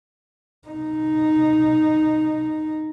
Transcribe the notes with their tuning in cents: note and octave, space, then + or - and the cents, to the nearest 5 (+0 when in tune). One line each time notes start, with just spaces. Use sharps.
D#4 -5